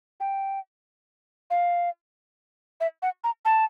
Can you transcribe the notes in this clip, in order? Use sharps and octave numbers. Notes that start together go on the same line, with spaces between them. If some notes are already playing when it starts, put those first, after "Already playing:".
G5
F5
E5
F#5
A#5
A5